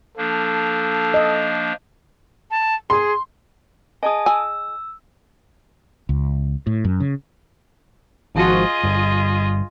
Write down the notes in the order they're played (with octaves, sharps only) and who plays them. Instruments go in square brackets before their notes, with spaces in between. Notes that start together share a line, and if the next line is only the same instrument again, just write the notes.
[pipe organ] F3 A#3 D4 [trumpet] A4
[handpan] D#5
[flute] A5
[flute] G#4 [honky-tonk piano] C6
[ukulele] G#4 D#5 [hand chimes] G#5 A5 D#6
[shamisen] G#5 [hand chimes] E6
[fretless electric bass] C#2
A2
F#2
C#3
[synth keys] G#1 F3 F#4 [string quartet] F4 G#4 D#5
[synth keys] G1 [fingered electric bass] G2